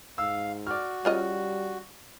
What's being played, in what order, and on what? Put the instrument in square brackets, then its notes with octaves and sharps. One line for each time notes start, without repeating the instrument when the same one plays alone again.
[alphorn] G#2 [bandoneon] F5 [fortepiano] E6
[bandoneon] F#4 [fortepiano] D5 F6
[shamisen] C#3 F4 D#5 [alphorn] G3